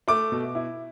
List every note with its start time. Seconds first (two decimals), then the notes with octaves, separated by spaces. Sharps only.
0.08 A3 D6
0.32 B2
0.55 E4